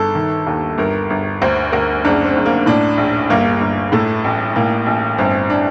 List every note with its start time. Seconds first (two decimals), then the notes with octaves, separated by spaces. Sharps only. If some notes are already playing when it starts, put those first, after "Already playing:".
Already playing: G1 A4
0.15 D#3
0.47 D#2
0.78 G1 A#4
1.10 G1
1.41 D2 C5
1.72 D2 A#4
2.05 F#1 D4
2.24 C4
2.36 F#1
2.46 A#3
2.66 A2 D4
2.98 A#1
3.30 G1 A#3
3.60 G1
3.92 A2 A3
4.24 A1
4.56 A2 A#3
4.86 A1
5.18 G1 C4
5.50 D4